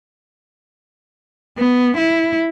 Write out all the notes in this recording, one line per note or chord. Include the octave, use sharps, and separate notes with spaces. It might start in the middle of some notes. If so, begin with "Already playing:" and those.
B3
E4